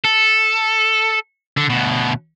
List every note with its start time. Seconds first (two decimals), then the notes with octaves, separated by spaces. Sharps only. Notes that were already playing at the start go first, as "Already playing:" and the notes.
0.04 A4
1.57 D3
1.70 D2 B2